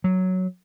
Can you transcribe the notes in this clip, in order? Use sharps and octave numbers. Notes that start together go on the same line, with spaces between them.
F#3